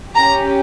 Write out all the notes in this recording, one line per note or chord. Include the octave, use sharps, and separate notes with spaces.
C#4 G4 A#5